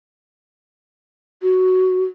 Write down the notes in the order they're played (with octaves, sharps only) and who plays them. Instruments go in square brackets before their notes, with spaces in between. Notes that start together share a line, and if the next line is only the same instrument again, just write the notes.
[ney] F#4